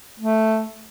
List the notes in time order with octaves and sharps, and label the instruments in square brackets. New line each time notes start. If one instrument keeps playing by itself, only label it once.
[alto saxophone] A3